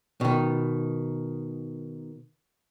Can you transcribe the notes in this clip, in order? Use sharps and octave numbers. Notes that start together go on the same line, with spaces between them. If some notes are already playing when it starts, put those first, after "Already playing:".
B2 D#3